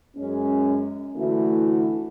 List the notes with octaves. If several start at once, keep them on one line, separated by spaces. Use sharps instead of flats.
F#2 G#3 C#4
D3 E3 A3 E4 F#4